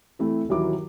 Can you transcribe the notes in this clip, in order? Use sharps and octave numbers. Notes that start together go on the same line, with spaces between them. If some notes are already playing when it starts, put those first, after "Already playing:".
E3 A3 C4 E4
D#1 D#3 E3 F#3 E4 D6